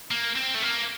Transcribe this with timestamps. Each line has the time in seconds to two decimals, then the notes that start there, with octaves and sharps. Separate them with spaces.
0.11 A#3
0.36 C4
0.55 A3
0.62 A#3